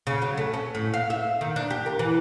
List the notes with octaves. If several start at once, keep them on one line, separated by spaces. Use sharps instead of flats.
C#3
F#3
A3
C#4
A2
F5
E5
D#3
D4
G4
A#4
E3